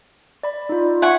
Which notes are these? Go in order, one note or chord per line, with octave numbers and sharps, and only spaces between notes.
D5 B5
D#4 F4
E5 F#5 G#5 C#6